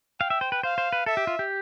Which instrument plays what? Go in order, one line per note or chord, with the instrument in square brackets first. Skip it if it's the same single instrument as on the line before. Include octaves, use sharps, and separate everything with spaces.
[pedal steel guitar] F5 [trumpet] G5
[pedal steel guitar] E5
C5
B4
[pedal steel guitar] C5 [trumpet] F5
[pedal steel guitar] C5
B4
[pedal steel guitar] A4 [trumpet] E5
[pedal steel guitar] G4
F4
G4